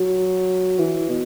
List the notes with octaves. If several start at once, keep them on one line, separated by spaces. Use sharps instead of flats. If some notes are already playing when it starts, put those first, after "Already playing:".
Already playing: F#3
E3
B2